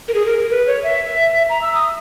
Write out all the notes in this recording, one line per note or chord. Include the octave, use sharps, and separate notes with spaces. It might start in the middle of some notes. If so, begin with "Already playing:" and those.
A#4
G#4
A#4
A#4
B4
C#5
E5
A#5
E6
D#6